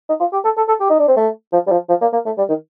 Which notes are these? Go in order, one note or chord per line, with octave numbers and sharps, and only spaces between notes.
D#4
F4
G4
A4
A4
A4
G4
D#4
D4
C4
A3
F3
G3
F3
F3
A#3
A#3
A3
G3
D#3